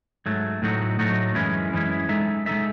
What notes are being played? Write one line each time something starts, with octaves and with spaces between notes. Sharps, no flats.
G#2 F#3 A3
A2 F#3 A3 D#4 F#4
A2 F#3 A3 D#4 F#4
F#2 E3 G#3 C#4 E4
F#2 E3 G#3 C#4 E4
G#3 D#4 A4 E5
G#3 D#4 A4 E5